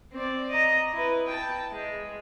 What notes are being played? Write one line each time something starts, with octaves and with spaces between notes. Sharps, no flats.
C4 D5
D#5 A#5
E4 B4
G5 A5
G#3